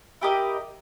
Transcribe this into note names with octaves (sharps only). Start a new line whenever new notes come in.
E4 G4 A#4 D#5